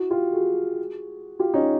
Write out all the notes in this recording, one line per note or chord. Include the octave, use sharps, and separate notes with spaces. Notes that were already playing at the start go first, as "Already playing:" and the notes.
Already playing: E4 F#4
F4 G4
F#4 G#4
F4 G4
C#4 D#4